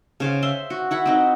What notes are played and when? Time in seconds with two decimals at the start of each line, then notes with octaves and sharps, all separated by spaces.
0.20 C#3 C5 F5
0.43 E5 C6
0.70 F#4
0.91 E4 F#5 B5
1.06 C4 D#4 B4